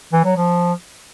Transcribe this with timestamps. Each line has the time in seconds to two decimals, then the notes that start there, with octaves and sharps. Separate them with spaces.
0.13 E3
0.25 F#3
0.37 F3